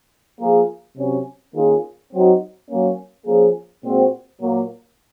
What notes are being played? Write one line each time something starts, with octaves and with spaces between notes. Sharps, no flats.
F3 A#3 F4 G#4
C3 F#3 C#4
D#3 A#3 C#4 F4 G#4
F#3 C4 D#4 F#4
F#3 A#3 C#4
F3 A#3 C#4 G#4
A#2 G#3 C4 F#4
A#2 F#3 A#3